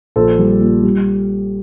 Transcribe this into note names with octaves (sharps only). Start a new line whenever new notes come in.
A#1 A4 C5
G3
A#2
G3